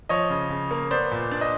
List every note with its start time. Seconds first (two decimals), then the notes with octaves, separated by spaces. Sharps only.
0.09 F3 C#5 D#5
0.30 C#3
0.50 C#3
0.71 A#3
0.91 B3 C5 D5
1.11 A#2
1.31 D4 D5
1.41 D#5